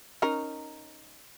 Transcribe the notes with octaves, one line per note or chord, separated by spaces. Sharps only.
C#4 D#4 A#4